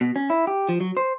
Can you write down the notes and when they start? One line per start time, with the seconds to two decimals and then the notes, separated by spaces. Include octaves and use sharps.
0.01 B2
0.16 C#4
0.30 E4
0.47 G4
0.69 F3
0.80 F#3
0.97 C5